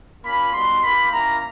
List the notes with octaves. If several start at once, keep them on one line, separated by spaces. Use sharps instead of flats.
A#3 C#4 F4 B5
G3 B3 D#4 F#4 C6
A#3 D#4 G4 B5
A#3 C#4 E4 A#5